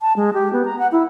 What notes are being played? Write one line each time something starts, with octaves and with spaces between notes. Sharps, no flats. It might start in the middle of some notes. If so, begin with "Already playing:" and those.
A5
G#3
G4
B3
A#5
F#5
E4